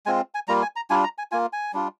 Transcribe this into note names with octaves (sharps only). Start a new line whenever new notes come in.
G#3 C4 F4 G#5
G#5
G3 A#3 F4 A#5
G#5
A#5
G3 D4 F4 G#5
A#5
G#5
A#3 F4 G#5
G#5
G3 D4 F4